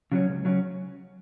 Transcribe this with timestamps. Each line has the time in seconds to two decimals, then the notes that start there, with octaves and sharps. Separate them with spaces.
0.12 C#3 F#3 C#4
0.28 C#2
0.45 C#3 F#3 C#4